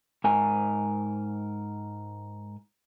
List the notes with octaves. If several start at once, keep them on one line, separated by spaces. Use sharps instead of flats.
G#2 A#4 G#5